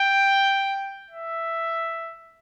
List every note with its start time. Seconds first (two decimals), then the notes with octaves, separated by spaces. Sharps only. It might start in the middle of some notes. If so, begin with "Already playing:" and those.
Already playing: G5
1.11 E5